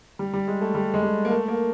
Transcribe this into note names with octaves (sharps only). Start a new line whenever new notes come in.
G3
G3
G#3
A3
G3
G#3
G3
A#3
A3
A#3